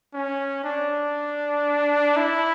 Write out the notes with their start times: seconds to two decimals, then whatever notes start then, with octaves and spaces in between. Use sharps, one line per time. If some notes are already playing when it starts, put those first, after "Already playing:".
0.14 C#4
0.64 D4
2.17 E4